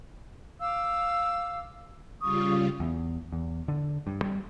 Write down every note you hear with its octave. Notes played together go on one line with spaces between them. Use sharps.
F5 D6 E6
C#3 G3 F4 C#6 D#6
E2
E2
D3
G2
G3